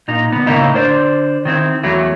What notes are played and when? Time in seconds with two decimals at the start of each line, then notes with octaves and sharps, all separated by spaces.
0.08 A#2 D#4
0.32 D3 B3
0.46 A2 C#3 G#3 A#3 D#4 E4
0.74 D3 C5 D5
1.45 D#3 C4 E4
1.83 E2 F#3 A3 E4